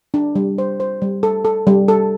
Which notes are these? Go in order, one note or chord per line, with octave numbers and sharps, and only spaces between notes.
D4
G3
C5
C5
G3
A4
A4
G3
A4